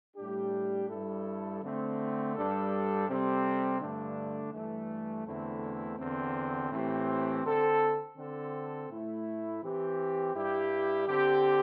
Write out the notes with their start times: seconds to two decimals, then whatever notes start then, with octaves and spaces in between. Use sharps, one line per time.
0.16 A2 G3 D4 G4
0.89 G2 G3 E4 A4
1.62 D3 A3 C4
2.34 G2 G3 D4 A4
3.07 C3 G3 C4 A4
3.80 G2 D3 A3 D4
4.52 G2 E3 A3
5.25 E2 D3 A3 C4 E4
5.98 E2 D3 C4
6.71 A2 E3 C4 G4
7.44 D3 C4 A4
8.15 D3 C4 A4
8.89 A2 A3 E4
9.62 E3 C4 G4
10.34 G2 G3 E4 G4
11.07 D3 C4 G4